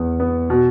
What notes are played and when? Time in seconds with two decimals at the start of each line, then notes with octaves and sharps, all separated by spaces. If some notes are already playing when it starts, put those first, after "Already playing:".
Already playing: E2 B3
0.20 B3
0.50 B2